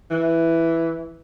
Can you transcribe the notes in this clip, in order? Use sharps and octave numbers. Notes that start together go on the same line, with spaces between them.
E3